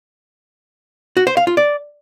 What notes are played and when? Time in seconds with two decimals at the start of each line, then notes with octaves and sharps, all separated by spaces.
1.17 F#4
1.27 C5
1.37 F5
1.47 F4
1.57 D5